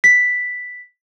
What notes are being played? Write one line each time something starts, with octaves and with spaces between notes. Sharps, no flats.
B6